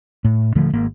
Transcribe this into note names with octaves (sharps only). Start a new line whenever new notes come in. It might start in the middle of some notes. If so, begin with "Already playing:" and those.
A2
D#1 D3 F3 A3
G#1 A#3